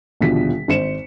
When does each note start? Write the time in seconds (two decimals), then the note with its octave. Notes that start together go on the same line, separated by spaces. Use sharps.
0.21 D#1 B2 D3 F3 B6
0.68 G#1 C5 C#7 E7